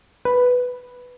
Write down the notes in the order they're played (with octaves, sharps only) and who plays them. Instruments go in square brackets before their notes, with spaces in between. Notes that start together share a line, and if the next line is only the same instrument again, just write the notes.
[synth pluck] B4